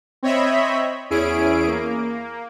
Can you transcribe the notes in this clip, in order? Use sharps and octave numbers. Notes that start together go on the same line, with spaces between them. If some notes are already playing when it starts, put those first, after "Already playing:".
C4 C#5 D#5 E5 B5
E2 C#4 E4 G#4 D7
A#3